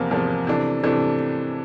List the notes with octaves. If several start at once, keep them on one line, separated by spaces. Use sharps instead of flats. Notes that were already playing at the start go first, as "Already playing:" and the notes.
Already playing: E2 C3 F3 A#3
E2 C3 F3 A#3
C3 E3 A3 D4
C3 E3 A3 D4